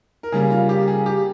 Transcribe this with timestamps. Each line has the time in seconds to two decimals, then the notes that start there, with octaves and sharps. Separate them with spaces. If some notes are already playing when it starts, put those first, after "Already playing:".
0.23 A#4
0.32 C#3 G3 A#3 G#4
0.51 F4
0.69 G4
0.88 G#4
1.06 G4